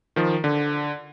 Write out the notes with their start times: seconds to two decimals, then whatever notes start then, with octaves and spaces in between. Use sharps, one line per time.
0.16 D#3 F3
0.44 D3